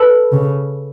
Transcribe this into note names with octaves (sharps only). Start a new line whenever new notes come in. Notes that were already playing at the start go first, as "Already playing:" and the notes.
Already playing: A4 B4
C#3